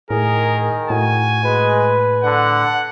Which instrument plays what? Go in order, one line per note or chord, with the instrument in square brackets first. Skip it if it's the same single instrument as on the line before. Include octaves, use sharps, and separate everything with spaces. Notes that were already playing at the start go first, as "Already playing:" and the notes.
[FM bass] A2 [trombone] D#3 [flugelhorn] G#4 [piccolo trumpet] A#4
[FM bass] A2 [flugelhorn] F#4 [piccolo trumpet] G#5
[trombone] G#3 [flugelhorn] B4
[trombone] D3 [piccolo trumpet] F#5